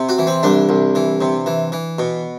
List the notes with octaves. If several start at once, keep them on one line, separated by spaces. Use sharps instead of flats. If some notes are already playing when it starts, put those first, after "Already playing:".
Already playing: C3
F#4
E3
C4
C2 D4
C2
E3
C3
E3
E3
B2